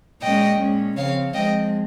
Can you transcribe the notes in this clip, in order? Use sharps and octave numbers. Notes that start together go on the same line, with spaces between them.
A#2 G#3 C#4 D#5 G5
A#2 G#3 C#4
C#3 F3 C4 C#5 F5
F3 G#3 C4 D#5 G5